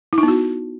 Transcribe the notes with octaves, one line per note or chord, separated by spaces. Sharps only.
E4
D#4
B3
F#4